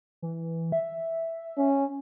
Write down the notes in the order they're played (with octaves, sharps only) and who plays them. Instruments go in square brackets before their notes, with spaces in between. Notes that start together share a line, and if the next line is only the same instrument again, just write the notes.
[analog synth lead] E3
E5
[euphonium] C#4